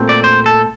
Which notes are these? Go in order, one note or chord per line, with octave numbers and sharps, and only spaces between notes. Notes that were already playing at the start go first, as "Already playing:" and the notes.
Already playing: A#2 A3 C4
D5
C5
A4